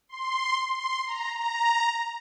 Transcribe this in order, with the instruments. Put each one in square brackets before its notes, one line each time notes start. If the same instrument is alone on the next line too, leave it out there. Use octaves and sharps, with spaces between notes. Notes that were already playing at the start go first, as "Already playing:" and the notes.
[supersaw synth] C6
C6
A#5
A#5